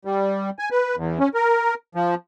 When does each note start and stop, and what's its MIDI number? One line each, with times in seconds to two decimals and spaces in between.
0.05 0.50 55
0.59 0.69 80
0.71 0.96 71
0.96 1.19 40
1.19 1.28 61
1.34 1.74 70
1.95 2.15 53